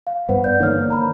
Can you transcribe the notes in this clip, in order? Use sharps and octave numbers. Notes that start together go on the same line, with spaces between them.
F5
G2 B3 B4 C5 F#5
B4 D5 G6
D3 E3 A#3 D#4 C#5 F6
A#5 B5